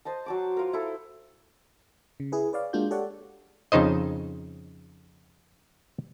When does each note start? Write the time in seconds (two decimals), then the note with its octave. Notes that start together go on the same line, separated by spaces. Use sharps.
0.05 C5 D#5 A5
0.26 F#3 A5 D6
0.57 F4 A#4
0.73 E4 A4
2.20 C#3
2.32 E4 G#4 B4
2.53 B4 C#5 D5 F5
2.73 G#3 A#3 D4 F4 F#4 G6
2.91 G4 A4 C#5 D5 F#5
3.72 F2 C#3 D#4 C5 D#5